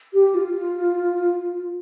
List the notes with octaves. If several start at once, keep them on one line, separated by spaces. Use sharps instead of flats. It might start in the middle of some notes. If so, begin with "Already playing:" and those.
G4
F4